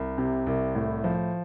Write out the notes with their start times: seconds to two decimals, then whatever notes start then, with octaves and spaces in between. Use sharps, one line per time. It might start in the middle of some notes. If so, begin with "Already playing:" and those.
Already playing: C2
0.18 C3
0.46 C2
0.75 A2
1.04 F3